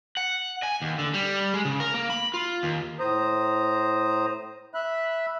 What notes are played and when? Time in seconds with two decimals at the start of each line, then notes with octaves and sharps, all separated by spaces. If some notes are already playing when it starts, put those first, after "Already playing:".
0.17 F#5
0.63 G#5
0.82 D#2
0.98 D3
1.14 G3
1.54 G#3
1.65 C#3
1.80 A#4
1.94 A#3
2.10 B5
2.34 F4
2.63 D#2
3.00 A2 C5 A#5 D#6
4.74 E5 B5 F#6